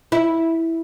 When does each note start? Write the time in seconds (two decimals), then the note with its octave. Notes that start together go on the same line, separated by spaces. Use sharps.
0.12 E4